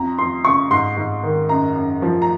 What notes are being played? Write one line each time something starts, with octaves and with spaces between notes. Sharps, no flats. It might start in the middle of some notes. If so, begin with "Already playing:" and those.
Already playing: F2 A#5
F2 C6
C#3 C#6
G#2 C6
G#2
D#3
F#2 A#5
F#2
F3
A#5